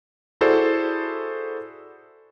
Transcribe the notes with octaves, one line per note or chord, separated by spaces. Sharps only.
E4 F#4 G#4 A4 C5 D5